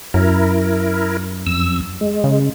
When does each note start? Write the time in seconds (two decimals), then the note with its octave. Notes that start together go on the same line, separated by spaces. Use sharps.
0.14 F#2 E4 A#4
1.46 F2 E6
2.01 G#3
2.24 C#3